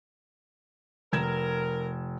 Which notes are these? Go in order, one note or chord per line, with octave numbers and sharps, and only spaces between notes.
F1 A#4 G#6 E7